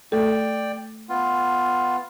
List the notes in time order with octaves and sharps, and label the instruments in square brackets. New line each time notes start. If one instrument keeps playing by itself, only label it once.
[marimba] A3 A4 [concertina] D5 G5
[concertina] B3 F4